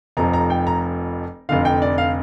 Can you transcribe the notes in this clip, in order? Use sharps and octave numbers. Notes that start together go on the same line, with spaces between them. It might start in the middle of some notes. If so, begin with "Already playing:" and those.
F1 F2 F3 A#5
A#5
G5
A#5
F1 F2 D3 F5
G5
D5
F5